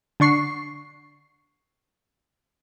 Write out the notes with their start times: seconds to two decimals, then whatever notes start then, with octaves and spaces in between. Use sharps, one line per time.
0.20 D3 D4 C#6 C7